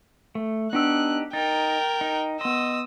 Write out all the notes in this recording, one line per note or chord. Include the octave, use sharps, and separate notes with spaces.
A3
B3 D4 D#4 G4 E6 F#6
D#4 A#4 G5 A6
D#4
B3 D#5 C6 D#6 E6